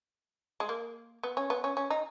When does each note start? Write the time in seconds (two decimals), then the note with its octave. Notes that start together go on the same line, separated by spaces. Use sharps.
0.60 G#3
0.69 A#3
1.23 B3
1.37 C#4
1.50 B3
1.64 C#4
1.77 C#4
1.90 D#4